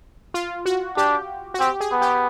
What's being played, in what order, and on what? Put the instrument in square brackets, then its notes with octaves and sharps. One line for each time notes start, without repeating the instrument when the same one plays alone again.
[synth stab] F4
F#4
[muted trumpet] D4 [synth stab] G4
[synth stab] F#4
[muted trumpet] C4 [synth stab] G4
[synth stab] G#4
[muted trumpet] B3
[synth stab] G4